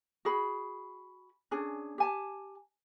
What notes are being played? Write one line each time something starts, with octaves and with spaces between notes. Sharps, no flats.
F#4 G#4 B5
C#4 D4 G#4
G4 G#5 A5